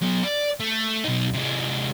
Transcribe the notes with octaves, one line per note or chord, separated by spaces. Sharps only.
F#3 B3
D5
A3
B1 D#4
C3 G#3